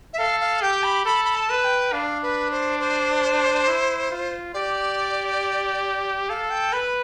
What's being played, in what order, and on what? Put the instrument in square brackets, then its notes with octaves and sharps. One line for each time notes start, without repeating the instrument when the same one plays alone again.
[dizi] E5
[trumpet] A4 [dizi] F5
[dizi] F5
[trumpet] G4 [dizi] G5
[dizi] B5
[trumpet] A4 [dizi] B5
[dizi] B5
A5
[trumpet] B4
[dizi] G5
[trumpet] D4 [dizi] F5
[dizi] B4
C5
C5
[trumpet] E4
F4
[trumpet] G4 [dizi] D5
[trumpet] A4 [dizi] F5
[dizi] G5
[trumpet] B4 [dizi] B5